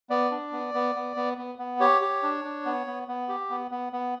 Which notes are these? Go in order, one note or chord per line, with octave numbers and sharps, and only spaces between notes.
B3 D5
D4
B3
B3
B3
B3
B3
B3
G4 C#5
G4
D4
D4
B3
B3
B3
G4
B3
B3
B3